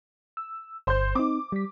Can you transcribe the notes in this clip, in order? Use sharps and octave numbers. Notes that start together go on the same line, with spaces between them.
E6
G1 C5 C6 G6
C4 D#4 D6
G3 B6